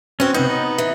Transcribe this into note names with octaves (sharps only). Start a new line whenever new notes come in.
C4 C#4 F#4
C3 B3 C4 D#4
D#4
E3